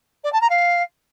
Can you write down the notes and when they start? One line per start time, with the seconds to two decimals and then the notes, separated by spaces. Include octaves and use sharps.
0.24 D5
0.33 A5
0.41 A#5
0.50 F5